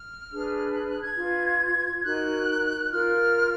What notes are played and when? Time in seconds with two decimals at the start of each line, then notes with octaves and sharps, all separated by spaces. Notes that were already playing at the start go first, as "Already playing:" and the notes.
Already playing: F6
0.30 D4 G#4 B4
0.74 F#6
0.88 F#6
1.03 G#6
1.17 F4 B4
2.04 D#4 F#4 A#4 F#6
2.90 F4 A#4 F6